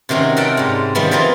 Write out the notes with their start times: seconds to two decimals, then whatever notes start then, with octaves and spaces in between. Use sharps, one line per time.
0.09 C3 D#3 F#3 C4 C#4
0.37 A#4 E5 F#5 G5 A5
0.57 G#2 G3
0.95 D#3 F3 G3 A3 B3
1.11 E3 F3 B3 C4 D#4 F4